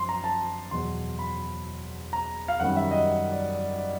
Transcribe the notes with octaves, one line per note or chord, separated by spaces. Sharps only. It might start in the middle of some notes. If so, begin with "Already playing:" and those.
Already playing: F#2 F3 C6
A#5
A5
E2 B2 F#3 C6
B5
A#5
F5
F#2 D#3 G3 F#5
E5
D#5
D#5
D5
D5
D5